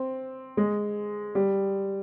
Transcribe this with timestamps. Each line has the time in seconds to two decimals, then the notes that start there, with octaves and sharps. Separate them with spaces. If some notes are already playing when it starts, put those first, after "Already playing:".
Already playing: C4
0.57 G#3
1.35 G3